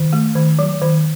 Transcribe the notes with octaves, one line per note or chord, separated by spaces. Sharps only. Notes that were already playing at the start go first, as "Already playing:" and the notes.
Already playing: D#3
A3
D#3
F#3
D#3